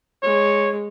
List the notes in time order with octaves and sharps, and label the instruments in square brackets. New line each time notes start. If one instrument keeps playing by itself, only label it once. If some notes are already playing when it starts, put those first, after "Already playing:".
[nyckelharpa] G#3 [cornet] C#5